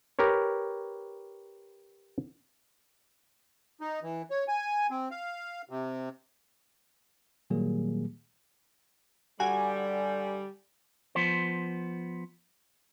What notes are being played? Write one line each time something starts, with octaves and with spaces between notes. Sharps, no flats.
G4 A#4 B4 C#5
D#4
E3
C#5
G#5
C4
F5
C3
A#2 D#3 F#3 G3 A#3 G#4
D3 G3 F#4 G#5
F3 B3 C5